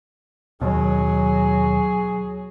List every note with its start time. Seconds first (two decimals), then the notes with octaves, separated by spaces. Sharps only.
0.62 D#2 B2 F#3 G#4